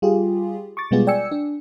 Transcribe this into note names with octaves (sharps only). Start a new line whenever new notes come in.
G3 F4 G4 G#4
C#6 D6 A6
B2 G3 G#3 B3 F4 G#4
D5 G5 G#5 E6 C#7
D4